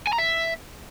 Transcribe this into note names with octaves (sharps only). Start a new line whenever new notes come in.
G#5
A#5
E5